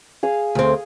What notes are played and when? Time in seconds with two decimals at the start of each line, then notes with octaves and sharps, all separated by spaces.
0.23 G#4 F5
0.55 D2 C4